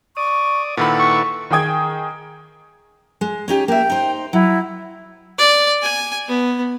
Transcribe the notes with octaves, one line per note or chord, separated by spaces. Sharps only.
D5 C#6 D#6
A#2 D#3 E4 A4 B4 F#5 B5
C#6
D#3 G#4 G5 D#6 G#6
G#3
C#4 D#4 G4
A#3 E5 G5
D#4 C5
F#3 E4
D5
G#5
B3